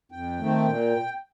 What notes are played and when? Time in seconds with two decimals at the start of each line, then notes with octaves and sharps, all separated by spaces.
0.12 F2 G5
0.40 D#3 A3 C4
0.66 A#2